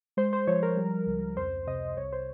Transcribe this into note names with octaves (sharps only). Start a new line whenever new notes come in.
G#3 C5
C5
F3 C#5
A#4
G3
C#2
F2 C5
C3 D#5
C2 C#5
C5